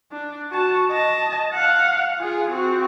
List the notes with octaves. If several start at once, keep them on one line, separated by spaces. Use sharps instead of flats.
D4
F#4 A5
D#5 A5
F5 F#5
F4 G#4
C4 F#4